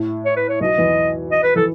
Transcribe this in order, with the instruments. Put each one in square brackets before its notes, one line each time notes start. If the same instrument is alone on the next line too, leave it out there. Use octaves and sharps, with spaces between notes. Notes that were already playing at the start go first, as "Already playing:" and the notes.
Already playing: [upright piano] A2
[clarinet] C#5
B4
C#5
[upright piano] B1 B2 [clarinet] D#5
[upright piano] E2 E3
[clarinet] D#5
B4
[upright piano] E3 [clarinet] A4